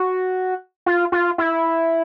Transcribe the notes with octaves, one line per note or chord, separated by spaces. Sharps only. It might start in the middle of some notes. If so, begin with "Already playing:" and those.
Already playing: F#4
F4
F4
E4